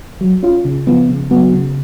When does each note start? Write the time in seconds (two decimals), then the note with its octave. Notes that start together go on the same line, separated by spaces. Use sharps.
0.21 F#3
0.43 C#4 F4
0.65 C#3
0.87 F3 B3 F4
1.09 C#3
1.31 F#3 B3 F#4
1.53 C#3